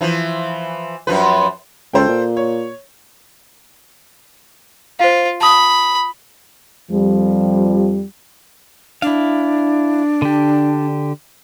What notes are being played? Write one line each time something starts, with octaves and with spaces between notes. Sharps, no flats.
E3 F3
F#2 F3 B4
C#2 A4 C5 G5
A#2
C#5
F4 C5 F5
A5 B5 D#6
F2 F3 G3
D4 E4 F5
D3 G4